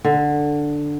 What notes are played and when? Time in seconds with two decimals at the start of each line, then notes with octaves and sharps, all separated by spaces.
0.05 D3